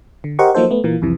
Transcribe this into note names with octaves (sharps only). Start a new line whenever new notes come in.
D3
G4 A#4 C5 D#5 F#5 C#6
F3 F#3 A#3 D#4 A4 C5
A3 B3
A#2 E3 A#3
C2 F2 C3 E3